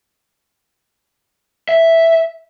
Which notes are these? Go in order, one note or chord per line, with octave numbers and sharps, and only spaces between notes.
E5